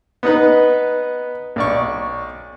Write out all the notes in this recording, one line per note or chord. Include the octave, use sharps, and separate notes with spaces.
B3 D#4 B4
B1 D5 C#6